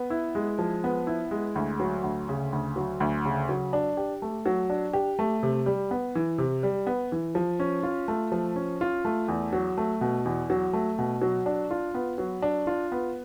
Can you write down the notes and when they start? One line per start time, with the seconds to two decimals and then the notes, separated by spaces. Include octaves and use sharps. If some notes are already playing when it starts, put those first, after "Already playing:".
Already playing: B3
0.10 E4
0.35 G#3
0.59 F3
0.84 B3
1.07 E4
1.31 G#3
1.55 D2
1.80 F#3
2.03 D2
2.29 C#3
2.53 D2
2.76 F#3
3.00 D2
3.25 C#3
3.49 F#3
3.73 D4
3.97 G4
4.22 A3
4.46 F#3
4.70 D4
4.93 G4
5.19 A3
5.43 C3
5.66 G3
5.91 B3
6.15 E3
6.38 C3
6.63 G3
6.87 B3
7.12 E3
7.35 F3
7.60 C#4
7.83 F4
8.08 A3
8.32 F3
8.56 C#4
8.81 F4
9.05 A3
9.28 E2
9.53 F#3
9.78 A3
10.01 B2
10.25 E2
10.50 F#3
10.73 A3
10.98 B2
11.22 F#3
11.46 D4
11.71 F4
11.94 B3
12.18 F#3
12.42 D4
12.67 F4
12.92 B3